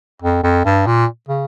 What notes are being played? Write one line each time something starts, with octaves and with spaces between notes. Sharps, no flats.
F2
F2
G2
A#2
C#3